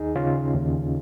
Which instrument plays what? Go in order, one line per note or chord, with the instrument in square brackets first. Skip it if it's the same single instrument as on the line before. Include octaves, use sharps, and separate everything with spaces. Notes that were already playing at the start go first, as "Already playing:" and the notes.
Already playing: [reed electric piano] D#2 D#4 G#4
C#3 C#4 F4
D#2